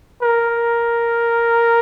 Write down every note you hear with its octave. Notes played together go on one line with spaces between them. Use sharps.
A#4